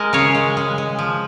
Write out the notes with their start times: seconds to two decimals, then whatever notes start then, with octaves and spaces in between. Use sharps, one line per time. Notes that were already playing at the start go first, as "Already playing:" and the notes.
Already playing: G#3 A#4 D#5
0.13 C#3 C#5 F5
0.35 G#3
0.57 G#3
0.78 G#3
0.99 F3